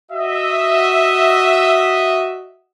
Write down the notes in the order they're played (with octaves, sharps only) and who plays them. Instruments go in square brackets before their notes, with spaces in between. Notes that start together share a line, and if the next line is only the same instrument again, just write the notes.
[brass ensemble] F#4 D#5 E5